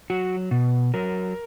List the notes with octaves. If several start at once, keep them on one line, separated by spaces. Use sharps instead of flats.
F#3 F#4
B2
F#3 A#4